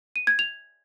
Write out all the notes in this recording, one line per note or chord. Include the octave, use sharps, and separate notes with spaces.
D#7
G#6
F7